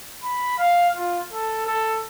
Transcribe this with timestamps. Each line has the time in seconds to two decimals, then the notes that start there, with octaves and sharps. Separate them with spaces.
0.23 B5
0.58 F5
0.97 F4
1.33 A4
1.66 A4